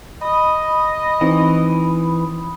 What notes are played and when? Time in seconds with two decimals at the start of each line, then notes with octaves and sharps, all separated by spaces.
0.21 D#5 B5 D#6
1.21 E3 C4 D#4